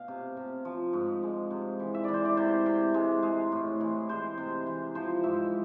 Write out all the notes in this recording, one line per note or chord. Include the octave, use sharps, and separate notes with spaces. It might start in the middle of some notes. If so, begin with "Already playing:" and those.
Already playing: B2 F5
C3
C3
F3
G#2
G#3
C3
E3
E5
E3 D5
C5
D5
C3 C5
C3
G#3
G#3
A2
E3
G#3 C5
C3
E3
F3 C5
G#2 E5